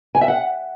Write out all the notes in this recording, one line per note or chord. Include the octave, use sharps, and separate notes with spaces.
G#5
E5
F#5